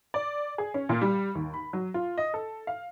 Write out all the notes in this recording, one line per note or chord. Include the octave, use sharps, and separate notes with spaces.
D5
G#4
C#4
A#2
G3
D#2
B5
F#3
F4
D#5
A4
F5